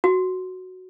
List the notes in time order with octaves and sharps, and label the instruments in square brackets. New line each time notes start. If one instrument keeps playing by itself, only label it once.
[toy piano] F#4